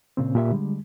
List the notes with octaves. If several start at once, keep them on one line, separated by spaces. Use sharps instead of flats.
A#2 C#3 C4
A#2 G4 E5
D3 G3 G#3